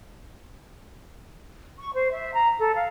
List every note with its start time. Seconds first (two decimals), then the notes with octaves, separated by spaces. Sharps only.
1.79 C#6
1.94 C5
2.11 E5
2.33 A#5
2.59 A4
2.75 F5